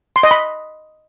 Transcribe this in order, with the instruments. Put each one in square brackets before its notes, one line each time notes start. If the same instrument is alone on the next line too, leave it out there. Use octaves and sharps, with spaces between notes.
[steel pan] C6
D#5
B5